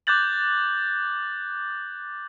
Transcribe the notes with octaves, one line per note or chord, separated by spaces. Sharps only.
D6 F#6 G6 A6 F#7